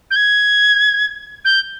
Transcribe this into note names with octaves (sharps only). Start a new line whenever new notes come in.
G6
G#6
G6